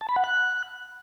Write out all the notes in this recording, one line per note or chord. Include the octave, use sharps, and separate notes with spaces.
A5
B5
F#5
F#6